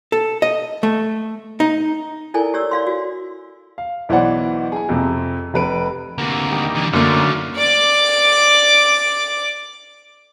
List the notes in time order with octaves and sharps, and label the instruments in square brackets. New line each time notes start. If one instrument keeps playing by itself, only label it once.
[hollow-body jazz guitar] A4
D#5
A3
D#4
[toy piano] E4 A4 A#4 D5 G#5
G4 C#5 D5 E6
D5 F5 C6
F#4
[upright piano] F5
B1 E3 B3 C5 D5 F#5
G#4 G#5
F2 C3
F1 B4 D7
[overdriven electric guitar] D2 C3 [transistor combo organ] A#3
[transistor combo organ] D#3 G3 A#3
[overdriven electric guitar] D3 E3
[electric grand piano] F#2 A#3 [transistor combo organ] D3 F#3 F5 [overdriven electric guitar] D#3 A3
[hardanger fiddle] D5 D6